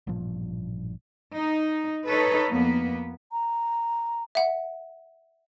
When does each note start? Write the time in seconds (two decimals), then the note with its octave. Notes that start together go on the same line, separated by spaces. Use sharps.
0.07 A1 G2 A#2 F3
1.34 D#4
2.09 D#4 A4 B4 C#5
2.49 F2 A#3 B3
3.32 A#5
4.35 E5 F#5